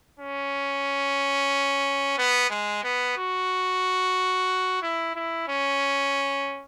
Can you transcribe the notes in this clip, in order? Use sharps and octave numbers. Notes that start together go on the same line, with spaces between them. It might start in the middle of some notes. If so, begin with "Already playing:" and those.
C#4
B3
G#3
B3
F#4
E4
E4
C#4